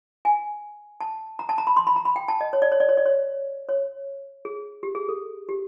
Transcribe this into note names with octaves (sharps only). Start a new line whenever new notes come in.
G#5
A5
A#5
A5
A#5
B5
C6
B5
A#5
B5
G5
A5
D#5
C#5
D5
C#5
D5
C#5
D5
C#5
C#5
G#4
G4
G#4
A4
G4